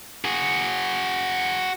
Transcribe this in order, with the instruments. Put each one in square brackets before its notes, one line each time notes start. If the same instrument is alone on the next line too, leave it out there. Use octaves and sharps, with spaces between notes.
[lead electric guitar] F#4 G#4